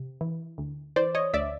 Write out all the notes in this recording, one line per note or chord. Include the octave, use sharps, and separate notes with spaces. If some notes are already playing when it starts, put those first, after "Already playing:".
Already playing: C3
E3
D2
E3 C5 D5
C#5 D#5
D2 D5 E5